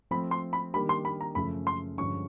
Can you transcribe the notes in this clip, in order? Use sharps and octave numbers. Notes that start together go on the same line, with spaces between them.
F3 A3 C4 B5
C6
B5
D#3 G3 A#3 D4 G4 B5
C6
B5
A#5
F#2 C#3 F3 A3 B5
C6
G2 D3 F3 G#3 C#4 C#6